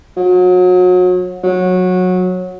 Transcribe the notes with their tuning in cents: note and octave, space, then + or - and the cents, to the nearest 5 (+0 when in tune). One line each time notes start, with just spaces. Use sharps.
F#3 -30
F#3 -15